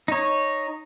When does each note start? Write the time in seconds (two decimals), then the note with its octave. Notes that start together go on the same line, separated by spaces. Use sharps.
0.08 D#4 C#5